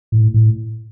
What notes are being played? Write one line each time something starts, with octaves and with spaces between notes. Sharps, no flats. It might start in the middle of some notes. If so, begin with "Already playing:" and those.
A2
A2